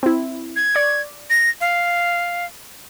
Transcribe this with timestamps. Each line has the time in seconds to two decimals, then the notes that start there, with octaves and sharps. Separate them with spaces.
0.03 C4 E4
0.56 G#6
0.75 D5 C#6
1.30 A#6
1.61 F5